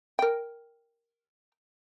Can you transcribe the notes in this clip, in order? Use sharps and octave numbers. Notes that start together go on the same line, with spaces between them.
A#4 G5